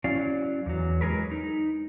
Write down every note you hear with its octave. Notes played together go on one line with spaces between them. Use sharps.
F#3 C#4 E4 D5 F5
E2 F#3
F#3 G#3 F4 G#4 A#4 B4
D#4